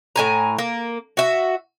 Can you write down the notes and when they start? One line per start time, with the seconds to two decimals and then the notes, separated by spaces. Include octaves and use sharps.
0.16 A2 G#5 A#5
0.58 A#3
1.17 F#4 E5